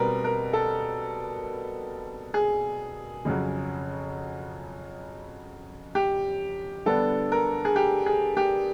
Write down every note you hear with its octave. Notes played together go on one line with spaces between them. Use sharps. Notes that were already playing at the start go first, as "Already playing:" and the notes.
Already playing: B2 G3 C4 A#4 B4
A#4
A4
G#4
F2 C#3 F#3
G4
D3 G3 B3 D4 A4
A#4
G#4
G4
G#4
G4